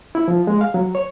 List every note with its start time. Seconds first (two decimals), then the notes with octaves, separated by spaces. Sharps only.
0.15 E4
0.28 F3
0.47 G#3
0.61 F5
0.74 F#3
0.95 C#5